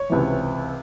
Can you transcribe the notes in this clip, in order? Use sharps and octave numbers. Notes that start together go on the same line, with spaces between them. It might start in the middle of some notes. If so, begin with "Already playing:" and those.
Already playing: C#5
C#2 C3 E3